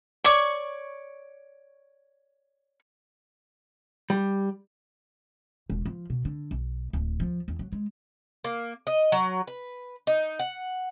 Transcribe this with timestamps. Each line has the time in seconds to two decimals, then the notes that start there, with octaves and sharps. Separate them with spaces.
0.24 C#5 D5 C#6
4.10 G3
5.70 E1
5.86 F3
6.10 B2
6.25 D3
6.51 B1
6.93 D1
7.20 F3
7.48 E2
7.59 F#3
7.72 G#3
8.44 A#3
8.87 D#5
9.12 F#3
9.47 B4
10.07 D#4
10.39 F#5